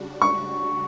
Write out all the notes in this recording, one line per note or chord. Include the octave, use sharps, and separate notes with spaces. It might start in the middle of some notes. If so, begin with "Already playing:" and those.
Already playing: C#3 G3 D4 F#4
C#6